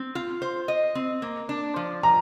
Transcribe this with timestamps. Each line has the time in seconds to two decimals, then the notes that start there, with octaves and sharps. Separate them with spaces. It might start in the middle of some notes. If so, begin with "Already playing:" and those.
Already playing: C4
0.15 F4
0.42 C5
0.68 D#5
0.95 C4
1.22 A#3
1.49 D4
1.76 F3
2.03 F3 A#5